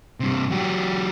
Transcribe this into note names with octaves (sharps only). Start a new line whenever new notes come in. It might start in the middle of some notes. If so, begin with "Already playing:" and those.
G2 C3
F#3 G4